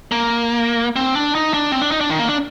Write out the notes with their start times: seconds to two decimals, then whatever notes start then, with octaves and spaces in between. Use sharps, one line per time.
0.12 A#3
0.96 C4
1.15 D4
1.35 D#4
1.54 D4
1.72 C4
1.81 D4
1.91 D#4
2.01 D4
2.10 D#3
2.19 A#3
2.28 D4